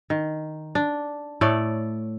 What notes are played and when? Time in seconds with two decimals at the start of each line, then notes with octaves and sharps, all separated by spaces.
0.10 D#3
0.75 D4
1.41 A2 A3 C#5 D5